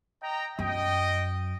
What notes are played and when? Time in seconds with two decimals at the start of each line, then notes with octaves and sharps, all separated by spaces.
0.23 D#5 G5 A#5
0.59 F#2 D#5 G5